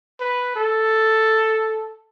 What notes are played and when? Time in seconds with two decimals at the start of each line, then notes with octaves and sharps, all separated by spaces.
0.20 B4
0.56 A4